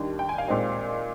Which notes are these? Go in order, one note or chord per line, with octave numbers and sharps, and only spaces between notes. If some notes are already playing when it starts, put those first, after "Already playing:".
Already playing: D#2 D#3 G3 D4
G5
G#5
F5
A#2 G#3 C4 D#4